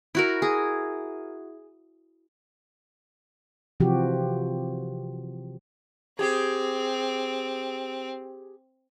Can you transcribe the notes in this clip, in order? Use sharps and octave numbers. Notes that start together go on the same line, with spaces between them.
E4 F#4 A#4
G#4
C3 E3 F3 F#4 G4
C4 G4 G#4